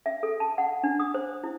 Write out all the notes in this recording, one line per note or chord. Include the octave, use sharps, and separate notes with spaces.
E5
A4
A5
F#5
D4
D#6
C5
E4